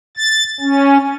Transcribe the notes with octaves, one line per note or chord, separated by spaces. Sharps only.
A6
C#4